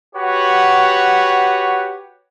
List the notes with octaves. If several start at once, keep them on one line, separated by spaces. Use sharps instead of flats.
F#4 G4 B4 C#5 F#5